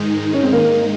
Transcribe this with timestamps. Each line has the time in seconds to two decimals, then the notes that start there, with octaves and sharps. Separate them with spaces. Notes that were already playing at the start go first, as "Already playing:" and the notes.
Already playing: G#2 D#3 G#3 D#4
0.33 C#4
0.43 C4
0.53 A#3